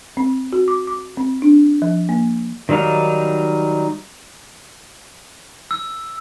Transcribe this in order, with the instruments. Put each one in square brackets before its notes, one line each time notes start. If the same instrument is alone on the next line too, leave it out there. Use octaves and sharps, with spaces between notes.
[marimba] C4
F#4
D6
D6
C4
D4
F3
A#3
[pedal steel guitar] D#3 F#3 G3 D#4 F5
[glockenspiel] E6